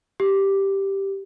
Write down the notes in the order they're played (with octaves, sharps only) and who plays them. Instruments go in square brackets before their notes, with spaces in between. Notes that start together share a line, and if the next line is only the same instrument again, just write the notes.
[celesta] G4